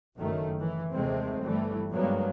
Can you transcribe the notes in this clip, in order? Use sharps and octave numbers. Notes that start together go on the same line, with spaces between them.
F#1 F#2 D#3 A3
E3
D#2 C3 G#3 A3 C4
G1 E3 G3 A3
G2 F#3 G#3 A#3 B3